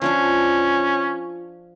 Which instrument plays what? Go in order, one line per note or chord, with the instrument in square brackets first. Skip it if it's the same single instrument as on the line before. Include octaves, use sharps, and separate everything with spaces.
[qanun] F3 D4 F4 [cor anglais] C#4